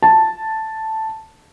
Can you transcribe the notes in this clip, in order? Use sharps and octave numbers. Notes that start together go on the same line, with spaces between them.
A5